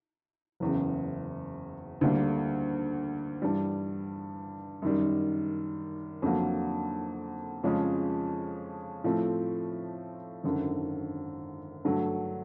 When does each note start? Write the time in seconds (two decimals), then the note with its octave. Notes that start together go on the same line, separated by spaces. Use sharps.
0.60 F#1 E2 C#3
2.01 D2 D3 G3 A#3
3.42 G2 E3 G3
4.82 F#2 D#3 G3
6.22 F2 D3 F#3 A#3
7.64 F2 C#3 F3 G#3 C#4
9.04 A2 F3 A3 C4
10.44 G#1 F#2 D3
11.85 G2 D3 F#3 A3